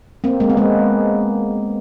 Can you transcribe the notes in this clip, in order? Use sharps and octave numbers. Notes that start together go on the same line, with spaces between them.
A#3 C4
G#3 A#3
B3
G#3 A#3